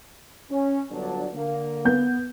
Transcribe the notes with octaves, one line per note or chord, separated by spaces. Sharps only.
C#4
G1 F#3 D4
D3 A#3
B3 G6